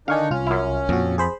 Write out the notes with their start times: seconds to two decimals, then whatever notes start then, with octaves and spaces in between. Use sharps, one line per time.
0.08 D3 D#3 D4 D#4 F5 G#5 C#6
0.31 C2 C#4 F4 F6
0.47 F#2 E4
0.89 F2 A#2 F#4
1.18 G#4 C5 B5